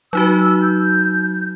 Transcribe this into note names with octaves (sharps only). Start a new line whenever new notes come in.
F#3 D#4 F#4 E6
G6